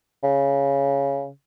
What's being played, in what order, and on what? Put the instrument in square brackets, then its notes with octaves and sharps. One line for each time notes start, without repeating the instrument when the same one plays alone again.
[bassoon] C#3